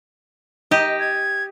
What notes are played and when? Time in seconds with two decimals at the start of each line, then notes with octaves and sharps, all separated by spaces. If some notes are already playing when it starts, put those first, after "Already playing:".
0.71 D#4 G4 D#5
1.00 G#6